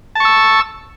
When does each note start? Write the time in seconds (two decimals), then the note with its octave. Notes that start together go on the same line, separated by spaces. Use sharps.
0.15 A5
0.20 C#6
0.25 E6